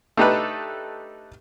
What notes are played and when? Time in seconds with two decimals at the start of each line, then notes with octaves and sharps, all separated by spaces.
0.17 A3 D4 D#4 G4 A4 B4